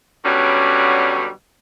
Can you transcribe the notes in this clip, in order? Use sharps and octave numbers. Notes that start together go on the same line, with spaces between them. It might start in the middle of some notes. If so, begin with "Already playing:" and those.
B2 D3 F#3 G3 C#4